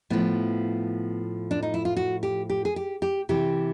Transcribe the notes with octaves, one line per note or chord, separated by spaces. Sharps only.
A2 F3 B3
D4
D#4
E4
F4
F#4
G4
G4
G#4
G4
G4
C3 E3 G4